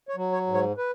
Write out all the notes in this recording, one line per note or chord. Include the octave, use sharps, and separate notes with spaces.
C#5
F#3
C#5
G#2
C#5
B4